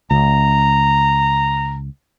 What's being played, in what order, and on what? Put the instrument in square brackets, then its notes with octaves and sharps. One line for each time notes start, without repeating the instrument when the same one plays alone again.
[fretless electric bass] C#2 [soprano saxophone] A#5